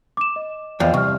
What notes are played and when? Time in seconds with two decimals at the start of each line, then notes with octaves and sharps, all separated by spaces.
0.17 D6 E7
0.36 D#5
0.80 E2 F3 D#5 F5 G5
0.94 C2 C#6 F6